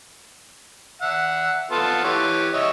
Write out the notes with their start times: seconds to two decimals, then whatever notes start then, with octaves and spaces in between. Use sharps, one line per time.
1.02 E5 F#5
1.71 B3 F4 A4
2.04 E3 G4 C#5
2.53 C#5 D#5 E5